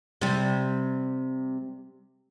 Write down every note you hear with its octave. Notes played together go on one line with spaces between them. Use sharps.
C3 G3